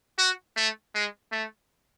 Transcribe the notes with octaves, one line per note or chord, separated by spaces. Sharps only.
F#4
A3
G#3
A3